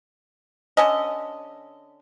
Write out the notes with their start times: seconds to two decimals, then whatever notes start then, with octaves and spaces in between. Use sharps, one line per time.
0.77 D3 C#4 D#5